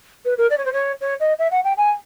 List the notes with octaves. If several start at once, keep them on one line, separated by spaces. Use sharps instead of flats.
B4
A#4
D5
C#5
C5
C#5
C#5
D#5
E5
F#5
G5
G#5